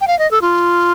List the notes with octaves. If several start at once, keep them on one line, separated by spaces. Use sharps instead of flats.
G5
F5
D#5
A4
F4